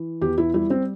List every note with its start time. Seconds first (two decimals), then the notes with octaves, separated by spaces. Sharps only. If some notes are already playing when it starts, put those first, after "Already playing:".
Already playing: E3
0.21 E2 G4
0.38 E4
0.54 G3 E4
0.70 C4